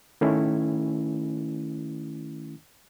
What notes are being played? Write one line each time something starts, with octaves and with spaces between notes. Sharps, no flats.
D#3 A3 C#4 E4